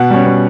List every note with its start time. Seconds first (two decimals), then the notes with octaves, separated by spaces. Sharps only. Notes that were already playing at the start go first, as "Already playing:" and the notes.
Already playing: B2 F#5
0.10 G3 C#4
0.26 B2